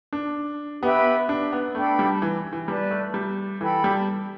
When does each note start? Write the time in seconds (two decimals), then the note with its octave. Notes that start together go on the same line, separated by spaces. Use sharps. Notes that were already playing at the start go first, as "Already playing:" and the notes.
0.13 D4
0.82 B3 G4 B4 E5 B5
1.29 D4
1.53 B3
1.75 A3 D4 A4 G5 B5
1.99 G3
2.22 E3
2.53 E3
2.68 G3 B4 D5 A5
2.91 A3
3.14 G3
3.61 E3 A4 G5 B5
3.84 G3